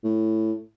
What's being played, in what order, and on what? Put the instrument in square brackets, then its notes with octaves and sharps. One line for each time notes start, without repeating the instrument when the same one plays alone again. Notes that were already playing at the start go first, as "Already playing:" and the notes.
[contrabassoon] A2